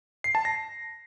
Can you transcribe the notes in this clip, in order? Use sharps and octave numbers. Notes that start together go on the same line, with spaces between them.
C7
A5
A#6